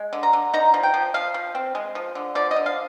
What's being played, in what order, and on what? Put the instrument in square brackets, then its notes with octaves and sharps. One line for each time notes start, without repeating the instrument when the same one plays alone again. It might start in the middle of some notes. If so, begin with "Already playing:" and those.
Already playing: [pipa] G#3
D3
A#5
D3
D#4 A#5
F3
G5
F3
F3 F5
F3
C4
G#3
F3
D3
F3 D5
D#5
D3
F5